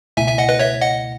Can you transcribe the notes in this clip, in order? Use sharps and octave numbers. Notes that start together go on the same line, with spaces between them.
C#2 B2 A3 E4 E5 G#5
E5 G#5
D#5 F#5
B4 D#5
C#5 E5
D#5 F#5